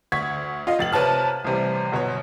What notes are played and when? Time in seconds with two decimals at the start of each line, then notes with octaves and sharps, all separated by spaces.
0.12 D2 C#6 G#6 B6
0.67 F4 D#5 F5
0.79 F1 A6 F#7
0.93 C3 B4 C#5 A5 F6
1.44 A1 C3 G3
1.92 G1 B2 F#3 C#5